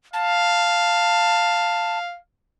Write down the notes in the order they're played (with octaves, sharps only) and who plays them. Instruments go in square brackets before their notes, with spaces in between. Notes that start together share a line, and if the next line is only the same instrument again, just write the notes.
[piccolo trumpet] F5 [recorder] A5